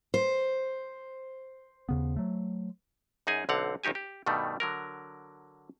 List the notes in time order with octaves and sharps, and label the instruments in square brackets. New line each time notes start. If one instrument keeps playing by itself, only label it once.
[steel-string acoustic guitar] C5
[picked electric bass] D#2 C#3 B3
F#3 A3
[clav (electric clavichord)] F#2 D#4 G#4 G#5
B1 D3 C4 F5 F#5
A#1 D#3 D#4 G4 G#5
G4
G2 B2 D#3 G3 A3
D3 F#3 A#4